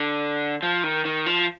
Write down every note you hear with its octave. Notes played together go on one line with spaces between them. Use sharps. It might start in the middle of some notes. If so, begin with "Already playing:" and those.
Already playing: D3
F3
D#3
D#3
F3